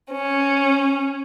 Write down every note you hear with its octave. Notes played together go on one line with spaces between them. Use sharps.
C#4